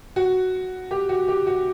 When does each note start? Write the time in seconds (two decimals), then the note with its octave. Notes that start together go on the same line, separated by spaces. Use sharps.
0.16 F#4
0.91 G4
1.09 F#4
1.28 G4
1.47 F#4